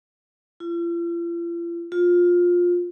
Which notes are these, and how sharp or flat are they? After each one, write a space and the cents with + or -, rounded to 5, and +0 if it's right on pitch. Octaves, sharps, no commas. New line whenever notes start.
F4 -45
F4 +15